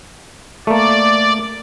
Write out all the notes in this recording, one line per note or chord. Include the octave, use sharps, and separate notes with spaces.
A3 A#3 D5